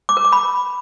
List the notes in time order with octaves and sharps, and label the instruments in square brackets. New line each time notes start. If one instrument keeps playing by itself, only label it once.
[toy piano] D6
A#4
D6
B5